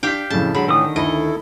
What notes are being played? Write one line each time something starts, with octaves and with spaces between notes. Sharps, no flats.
D4 G4 F5 G5 B6
F2 A2 C#3 A5
D3 F#3 G#3 B5
A2 D#3 E3 D#6 E6
D2 E4 A4 D#5